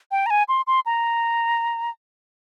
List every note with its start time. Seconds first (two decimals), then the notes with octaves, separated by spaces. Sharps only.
0.11 G5
0.26 A#5
0.30 G#5
0.49 C6
0.67 C6
0.86 A#5